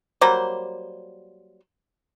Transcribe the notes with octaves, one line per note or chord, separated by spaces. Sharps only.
F#3 G3 A#3 C5